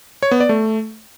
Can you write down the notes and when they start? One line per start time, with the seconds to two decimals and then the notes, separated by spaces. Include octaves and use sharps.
0.23 C#5
0.31 B3
0.40 D5
0.49 A3